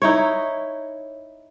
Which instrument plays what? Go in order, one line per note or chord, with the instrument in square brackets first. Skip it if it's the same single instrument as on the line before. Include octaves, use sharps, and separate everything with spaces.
[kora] D#4 E4 C#5